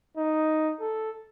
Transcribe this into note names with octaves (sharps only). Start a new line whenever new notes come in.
D#4
A4